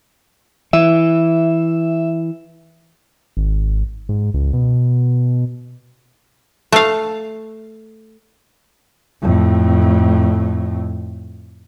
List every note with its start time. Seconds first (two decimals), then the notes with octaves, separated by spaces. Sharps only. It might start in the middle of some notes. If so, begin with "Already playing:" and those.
0.73 E3 E5
3.37 G#1
4.09 G#2
4.34 C#2
4.53 B2
6.72 A3 F5
9.22 F2 A2